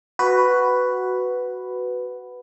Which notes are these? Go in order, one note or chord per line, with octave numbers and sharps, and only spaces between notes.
F#4 B4